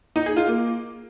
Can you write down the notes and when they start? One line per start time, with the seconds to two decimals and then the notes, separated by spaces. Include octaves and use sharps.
0.16 D#4
0.26 G#4
0.37 F4
0.47 A#3